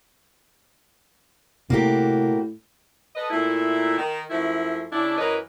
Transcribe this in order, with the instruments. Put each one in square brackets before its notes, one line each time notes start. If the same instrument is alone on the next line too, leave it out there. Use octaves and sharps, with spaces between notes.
[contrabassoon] A2 [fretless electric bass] C3 [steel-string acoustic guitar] A#3 F#4 G4
[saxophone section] A4 B4 D#5
A#2 A3 E4
D#3
F#2 F3 A3 E4
C#3 D4 E4
F#2 E3 A#4 B4 C#5 D#5